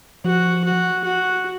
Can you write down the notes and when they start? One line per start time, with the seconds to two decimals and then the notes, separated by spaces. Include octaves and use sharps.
0.24 F3 F#4
0.64 F#4
1.04 F#4